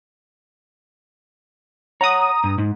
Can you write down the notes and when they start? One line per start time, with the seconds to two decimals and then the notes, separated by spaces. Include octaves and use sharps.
2.01 C#5 F#5 A#5 D#6
2.44 G2
2.58 G#2